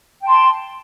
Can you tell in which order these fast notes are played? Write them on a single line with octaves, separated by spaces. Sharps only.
G5 A5 C6